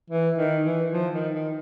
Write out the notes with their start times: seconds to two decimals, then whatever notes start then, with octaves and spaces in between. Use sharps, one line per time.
0.10 E3
0.38 D#3
0.65 E3
0.93 F3
1.14 D#3
1.34 D#3